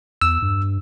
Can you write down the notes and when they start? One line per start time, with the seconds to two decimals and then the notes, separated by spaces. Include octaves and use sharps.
0.22 E2 E6
0.42 G2